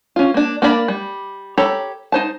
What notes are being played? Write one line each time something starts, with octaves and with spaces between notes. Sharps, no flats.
C#4 F4
A#3 D4
A#3 D4 A#4 D5 B5
G3
G4 A4 C#5 A#5 B5
D#4 C5 A5